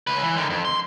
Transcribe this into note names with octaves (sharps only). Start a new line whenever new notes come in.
C#2 B4
E3
D3 D#3
F2
C6